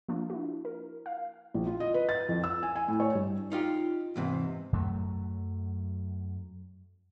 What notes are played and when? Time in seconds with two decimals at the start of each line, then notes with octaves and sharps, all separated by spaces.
0.09 F3 A#3 D4 F4
0.30 E4 F#4
0.65 A#4
1.06 F5
1.54 A#1
1.67 F4
1.80 D#5
1.94 B4
2.09 A6
2.29 F2
2.44 E6
2.63 G#5
2.76 G#5
2.88 A2
3.00 C#5
3.15 G2
3.52 D#4 F4 G4
4.16 E2 G#2 C3
4.73 F#2 F#3 A3